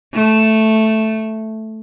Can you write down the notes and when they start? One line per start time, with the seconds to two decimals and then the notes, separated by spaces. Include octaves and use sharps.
0.14 A3